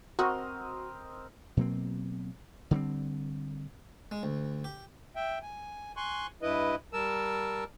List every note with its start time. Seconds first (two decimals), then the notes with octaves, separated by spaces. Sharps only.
0.19 C4 F#4 A#4 D#5
1.57 B2 F#3 A#3 C4
2.71 D3 G3 B3 C4
4.11 G#3
4.23 D2
4.64 G4
5.16 E5 G5
5.42 G#5
5.97 G#5 C6 C#6 F#6
6.42 G2 E4 B4 D#5
6.93 G3 A#4 A5 E6